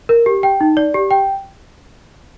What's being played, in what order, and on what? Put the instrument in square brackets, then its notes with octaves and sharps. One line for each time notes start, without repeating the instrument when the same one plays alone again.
[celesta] A#4
G4
G5
D#4
D5
G4
G5